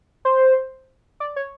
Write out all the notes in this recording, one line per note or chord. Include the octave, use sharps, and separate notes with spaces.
C5
D5
C#5